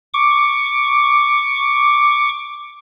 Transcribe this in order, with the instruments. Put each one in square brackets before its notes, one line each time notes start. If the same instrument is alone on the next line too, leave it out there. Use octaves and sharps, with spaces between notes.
[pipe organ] C#6 D6